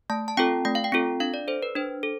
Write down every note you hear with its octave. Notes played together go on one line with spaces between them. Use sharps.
A3 A5
A5
C4 F4 A4 G5
A3 G5
F5
G5
C4 F4 A4
D4 F5
D5
A4 C5
B4
D4 C5
A4